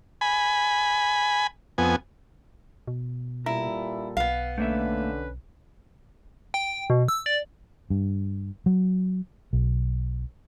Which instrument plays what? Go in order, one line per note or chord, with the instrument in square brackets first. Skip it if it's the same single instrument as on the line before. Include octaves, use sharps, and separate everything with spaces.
[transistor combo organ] G#5 B5
F2 B3 G#5
[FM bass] B2
[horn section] A#2 G3 A4 [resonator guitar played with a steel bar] E4 [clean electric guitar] A#5
[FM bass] B1 [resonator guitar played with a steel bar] B3 F5
[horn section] D3 C#4 B4 [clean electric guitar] A3 A#3 E5
[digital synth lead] G5
B2
E6
D5
[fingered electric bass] G2
F#3
B1